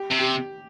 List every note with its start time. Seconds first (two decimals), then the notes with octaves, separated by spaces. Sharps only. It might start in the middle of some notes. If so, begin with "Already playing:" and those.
Already playing: G4
0.11 C3
0.19 G4